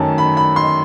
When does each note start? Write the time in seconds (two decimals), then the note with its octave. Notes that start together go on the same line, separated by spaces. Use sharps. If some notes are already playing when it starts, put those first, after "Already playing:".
Already playing: F#2 D#3 F#3 A3 C#4 G#5 A5
0.18 B5
0.37 B5
0.56 C6